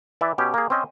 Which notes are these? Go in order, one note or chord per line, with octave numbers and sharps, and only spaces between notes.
E3 D5 E5
B2 C#4 G4
A#3 G#4
C4 C#4 C5 D#5